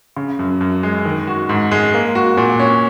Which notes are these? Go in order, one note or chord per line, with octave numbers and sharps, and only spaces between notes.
C#3
F#2
F#2
G#3
D#3
F#4
G#2
G#3
A#3
F#4
A#2
C#4